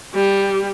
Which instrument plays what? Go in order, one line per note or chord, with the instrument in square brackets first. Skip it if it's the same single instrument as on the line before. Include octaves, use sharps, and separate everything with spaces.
[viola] G3